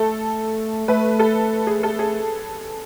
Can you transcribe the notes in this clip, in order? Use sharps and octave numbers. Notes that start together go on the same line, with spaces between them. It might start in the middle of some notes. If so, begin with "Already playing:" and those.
Already playing: A3 A4
A3 B4
A4
G#4
A4
G#4